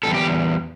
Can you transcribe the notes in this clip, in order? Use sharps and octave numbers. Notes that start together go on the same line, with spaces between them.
E2 B2 G3 A4
G4